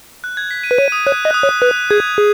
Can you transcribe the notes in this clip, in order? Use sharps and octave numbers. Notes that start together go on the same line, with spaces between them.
F#6
G#6
B6
D#7
B4
C#5 D#7
D#6
C#5 F#6
D#5
F#6
D#6
C#5
B4 F#6
G#4 G#6
G#4